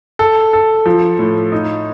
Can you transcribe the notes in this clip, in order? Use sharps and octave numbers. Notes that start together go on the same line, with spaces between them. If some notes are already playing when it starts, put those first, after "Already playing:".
A4
A4
F3
A2
D#4